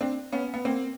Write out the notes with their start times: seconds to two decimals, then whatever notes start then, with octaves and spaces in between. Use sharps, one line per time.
0.01 C4 D4
0.32 B3 C#4
0.54 B3
0.65 A#3 C4